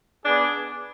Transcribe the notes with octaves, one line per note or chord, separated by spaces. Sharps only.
B3 D4 G#4 D5